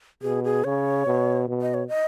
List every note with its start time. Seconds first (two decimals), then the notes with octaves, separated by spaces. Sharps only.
0.22 B2 G#4
0.44 G#4
0.64 C#3 C#5
1.07 B2
1.48 B2
1.62 D#5
1.74 C#5
1.88 D#5